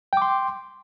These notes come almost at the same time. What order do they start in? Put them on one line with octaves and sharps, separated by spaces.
G5 D6 C6